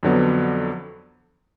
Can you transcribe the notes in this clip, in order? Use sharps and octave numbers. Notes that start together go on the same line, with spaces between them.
F2 D3 F#3 B3